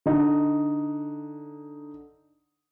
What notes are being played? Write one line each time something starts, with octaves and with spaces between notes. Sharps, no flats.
D3 D#4